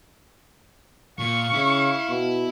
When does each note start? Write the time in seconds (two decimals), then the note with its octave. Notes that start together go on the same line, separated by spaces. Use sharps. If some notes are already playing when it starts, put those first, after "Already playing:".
1.19 A#2 F5 C#6
1.53 C#3 E4
2.09 B2